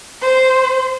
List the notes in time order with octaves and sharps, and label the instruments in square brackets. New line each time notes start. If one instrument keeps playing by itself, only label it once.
[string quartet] C5